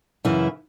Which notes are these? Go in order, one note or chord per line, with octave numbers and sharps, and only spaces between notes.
F#2 C#3 E3 E4